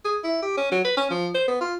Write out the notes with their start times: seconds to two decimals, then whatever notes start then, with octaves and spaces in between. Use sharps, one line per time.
0.05 G#4
0.24 E4
0.42 G4
0.57 C#4
0.72 F#3
0.84 B4
0.97 C#4
1.10 F3
1.34 C5
1.48 B3
1.61 F4